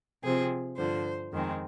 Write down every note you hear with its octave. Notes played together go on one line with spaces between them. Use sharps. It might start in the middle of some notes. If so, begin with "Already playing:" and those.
C3 F3 C4 G#4
G2 D3 F3 C5
F2 D#3 G#3 C4